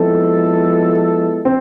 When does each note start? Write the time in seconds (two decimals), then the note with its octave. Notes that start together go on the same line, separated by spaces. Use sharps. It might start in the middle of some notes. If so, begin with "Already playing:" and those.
Already playing: F3 G#3 B3 C4 E4 A4
1.45 C4